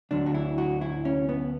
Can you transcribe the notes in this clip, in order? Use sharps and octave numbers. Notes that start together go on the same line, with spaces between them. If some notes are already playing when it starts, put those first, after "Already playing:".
D2 D3 F#3 D4
F#4
E4
F#4
E4
C#4
B3